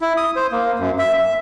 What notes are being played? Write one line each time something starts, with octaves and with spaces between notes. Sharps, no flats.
E4
D#6
C5
A#3
F#2
E5
E5